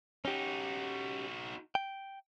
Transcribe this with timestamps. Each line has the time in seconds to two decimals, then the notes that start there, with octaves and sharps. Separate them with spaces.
0.25 C#4 D#4 F#4 G4
1.75 G5